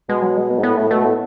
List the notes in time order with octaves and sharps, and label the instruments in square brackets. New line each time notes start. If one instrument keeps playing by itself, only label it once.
[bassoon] B2 [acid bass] G#3
[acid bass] F#3
G#3
B3
[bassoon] G#2
[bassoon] A2 [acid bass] B3
[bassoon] A2 [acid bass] A3
[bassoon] B2 [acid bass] A3
[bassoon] A2 [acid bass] B3